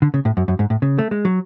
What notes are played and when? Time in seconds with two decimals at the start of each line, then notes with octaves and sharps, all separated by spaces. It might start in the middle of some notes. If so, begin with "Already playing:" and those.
0.02 D3
0.14 C#3
0.25 A2
0.37 F#2
0.48 F#2
0.59 G#2
0.70 A2
0.82 C#3
0.99 A3
1.11 G#3
1.25 F#3